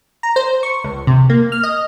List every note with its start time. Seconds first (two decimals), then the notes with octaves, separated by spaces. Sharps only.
0.23 A#5
0.36 C5
0.63 C#6
0.84 C#2
1.07 C3
1.30 A#3
1.52 F6
1.63 D#5